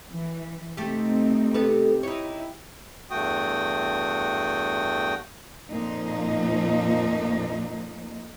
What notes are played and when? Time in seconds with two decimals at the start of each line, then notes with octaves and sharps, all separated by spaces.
0.11 E3
0.77 C3 A3 C4 D#4 G4
1.54 B3 G4 A4 B4
2.03 D#4 E4 C#5
3.11 E2 G2 A3 F#4 G5 D#6
5.68 F2 A#2 F3 A#3 D#4